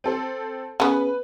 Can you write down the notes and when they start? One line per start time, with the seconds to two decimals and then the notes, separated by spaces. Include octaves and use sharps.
0.04 C4 A4 C5
0.80 C#3 B3 B4